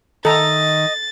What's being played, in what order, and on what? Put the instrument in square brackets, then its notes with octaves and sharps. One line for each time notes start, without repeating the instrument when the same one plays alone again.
[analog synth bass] D#3 [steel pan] A4 A#5 [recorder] D#5 [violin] A6